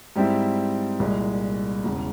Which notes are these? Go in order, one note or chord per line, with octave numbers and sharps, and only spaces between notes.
G#2 G3 C4 E4
C2 A#2 G#3
E1 E2 C#3